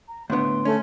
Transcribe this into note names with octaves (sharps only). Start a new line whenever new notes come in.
A#5
A2 D3 B3 D4 C6
A3 C#4